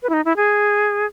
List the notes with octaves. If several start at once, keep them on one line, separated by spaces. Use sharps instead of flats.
B4
E4
D#4
E4
G#4